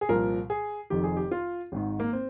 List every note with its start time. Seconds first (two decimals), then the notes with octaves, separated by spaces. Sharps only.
0.01 G#4
0.09 C2 A#2 F3 A#4
0.50 G#4
0.90 F1 F2 D#3 G4
1.04 G#4
1.17 G4
1.31 F4
1.72 G#1 G#2 D#3
2.00 A#3
2.13 C4